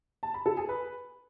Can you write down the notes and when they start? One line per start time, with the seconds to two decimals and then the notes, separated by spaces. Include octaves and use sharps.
0.23 A5
0.34 B5
0.46 A4
0.57 G#4
0.69 B4